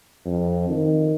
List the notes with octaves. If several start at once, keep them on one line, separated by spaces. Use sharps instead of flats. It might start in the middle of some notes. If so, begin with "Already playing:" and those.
F2
D#3